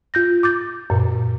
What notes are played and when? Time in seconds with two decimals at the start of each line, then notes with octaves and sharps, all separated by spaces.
0.14 F4 G6 A#6
0.43 D6 G6 A6
0.90 F#2 A#2